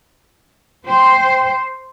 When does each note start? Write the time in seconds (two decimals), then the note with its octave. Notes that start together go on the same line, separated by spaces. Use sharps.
0.87 C5 G5